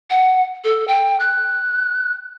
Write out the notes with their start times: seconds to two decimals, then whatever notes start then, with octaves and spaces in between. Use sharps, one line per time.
0.10 F#5
0.64 A4
0.88 G5
1.20 F#6